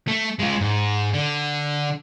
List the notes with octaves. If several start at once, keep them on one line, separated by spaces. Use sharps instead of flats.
A3
G#3 F4
G#2
D3